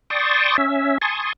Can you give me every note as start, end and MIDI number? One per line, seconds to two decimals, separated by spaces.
0.10 0.57 74
0.10 0.57 79
0.10 0.57 81
0.10 0.57 84
0.10 0.57 85
0.10 0.57 87
0.58 0.98 61
0.58 0.98 76
1.02 1.33 80
1.02 1.33 81
1.02 1.33 84
1.02 1.33 85
1.02 1.33 87